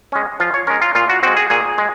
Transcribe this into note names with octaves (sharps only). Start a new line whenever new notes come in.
G#3 C#4
F3 F4
C#5
G#3 C#4 A#4
F4
A#2 F4
F#4
G#3 C4 F#4
G#4
A#2 G#4
G#3